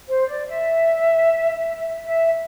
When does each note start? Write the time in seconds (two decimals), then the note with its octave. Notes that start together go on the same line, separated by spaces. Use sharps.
0.08 C5
0.28 D5
0.48 E5
2.06 E5